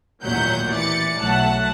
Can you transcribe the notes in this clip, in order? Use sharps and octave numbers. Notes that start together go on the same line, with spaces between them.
A1 D#2 A#2 F#3 F#5 G6
E3 D5 A6 C#7
B1 F#3 A3 F#5 A5